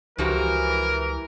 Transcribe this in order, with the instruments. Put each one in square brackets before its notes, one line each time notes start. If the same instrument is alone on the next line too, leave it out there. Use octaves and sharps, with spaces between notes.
[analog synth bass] C#2 [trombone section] E3 [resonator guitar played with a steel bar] F3 F#4 G4 [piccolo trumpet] A#4